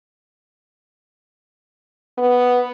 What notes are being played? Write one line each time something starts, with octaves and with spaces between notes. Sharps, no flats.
B3